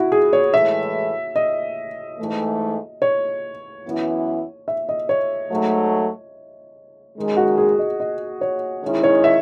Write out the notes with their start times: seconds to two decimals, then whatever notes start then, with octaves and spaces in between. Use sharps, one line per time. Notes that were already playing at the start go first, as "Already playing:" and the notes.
Already playing: E4 F#4
0.12 G#4
0.33 C#5
0.53 A2 E3 G#3 E5
1.36 D#5
2.19 G#2 E3 A3
3.02 C#5
3.85 F#2 E3 B3 E4
4.68 E5
4.89 D#5
5.09 C#5
5.51 G#2 F#3 A3
7.16 F#2 D#3 G#3
7.37 F#4
7.58 G#4
7.79 D#5
8.00 D#5
8.41 C#5
8.83 D#3 G#3 C#4 E4
9.03 C#5
9.24 E5